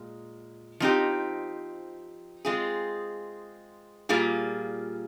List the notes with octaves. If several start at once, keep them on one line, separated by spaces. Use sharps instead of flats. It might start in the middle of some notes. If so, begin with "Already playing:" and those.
Already playing: A#2 G#3
F3 C4 D#4 G4
G#3 C4 F4 G#4
A#2 G3 A#3 F4 G#4